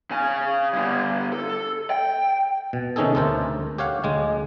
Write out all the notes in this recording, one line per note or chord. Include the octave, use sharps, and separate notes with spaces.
C#3 G#5
G2 D3
A4
G5
B2
C3 D#3 C#4 D#4 G#4 A4
D2 A3 A4 A#4 C5
G4 C#5 F5 F#5
D2 G#3 G#5